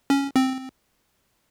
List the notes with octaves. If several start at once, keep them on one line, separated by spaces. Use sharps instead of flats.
C#4
C4